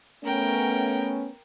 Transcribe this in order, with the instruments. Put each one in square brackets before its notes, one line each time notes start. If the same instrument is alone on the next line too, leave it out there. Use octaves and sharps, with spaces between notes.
[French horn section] A3 B3 C#4 [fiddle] A#4 G5